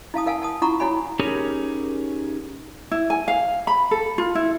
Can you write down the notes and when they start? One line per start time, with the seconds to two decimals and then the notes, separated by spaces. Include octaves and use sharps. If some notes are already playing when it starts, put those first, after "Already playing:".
0.14 E4 F5 A5 D#6
0.26 A#4 F5 F#5 G#5 A5
0.42 F#5 A5 D#6
0.62 E4 F4 F#5 A#5 C#6
0.80 E4 F#4 C#5 F#5 G#5 B5
1.19 C#4 D#4 G4 G#4 A#4 C#5
2.91 E4
3.10 G#5
3.28 F5
3.67 B5
3.91 A4
4.18 F4
4.35 E4